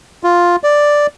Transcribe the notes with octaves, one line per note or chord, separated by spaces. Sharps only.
F4
D5